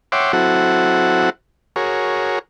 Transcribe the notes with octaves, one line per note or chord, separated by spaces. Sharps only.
C#5 E5 F#5 G5 C6 D6
F#3 C4 E4 F#4 A4 F#5
F#4 G#4 A#4 C#5